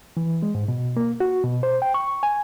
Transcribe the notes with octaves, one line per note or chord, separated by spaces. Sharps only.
E3
G#3
G#2
B2
A#3
F#4
B2
C5
G5
C#6
G#5